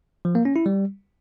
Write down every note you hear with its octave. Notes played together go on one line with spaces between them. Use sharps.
F3
A#3
C#4
E4
G3